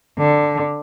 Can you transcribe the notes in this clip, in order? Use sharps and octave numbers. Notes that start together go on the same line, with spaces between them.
D3